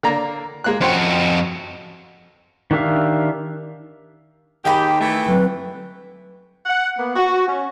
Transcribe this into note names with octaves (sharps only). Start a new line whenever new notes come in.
D3 A#3 A#5
G#3 A#3 F#6
F2 C#4 F#4 C5 G5
D#3 D4 G4 E5 F5
D#2 D#3 G4 G#4 G5 A5 B5
E3 A3
D3 F#3 C4 B4
F#5
A#3 B3
F#4
C#4